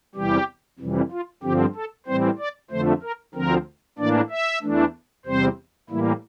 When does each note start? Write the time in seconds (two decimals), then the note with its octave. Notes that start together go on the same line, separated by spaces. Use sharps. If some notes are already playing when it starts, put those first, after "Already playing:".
0.15 E2 C3 E3 G3 G4
0.79 F2 C3 E3 G3
1.11 F4
1.43 G2 D3 F3 C4 G4
1.75 A4
2.07 A2 E3 G3 C4 C5
2.38 D5
2.71 F2 D3 F3 A3 C5
3.02 A#4
3.34 D2 D3 F3 C4 A#4
3.98 A2 E3 A#3 D4 D5
4.30 E5
4.62 E2 E3 A3 D4
5.26 E2 C3 G3 C4 C5
5.90 A2 E3 G3 A#3 E4